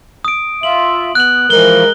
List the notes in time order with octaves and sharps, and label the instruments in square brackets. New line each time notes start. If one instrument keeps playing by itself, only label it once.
[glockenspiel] D#6 D7
[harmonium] F4 E5 [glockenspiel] F#7
[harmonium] B3 [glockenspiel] F#6 F#7
[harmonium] E3 F3 [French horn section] G#3 A#4 [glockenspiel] G7